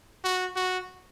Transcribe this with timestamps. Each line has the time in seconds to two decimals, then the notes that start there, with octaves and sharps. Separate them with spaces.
0.24 F#4
0.56 F#4